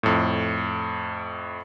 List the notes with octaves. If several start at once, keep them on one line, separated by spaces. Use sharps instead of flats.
F2 A2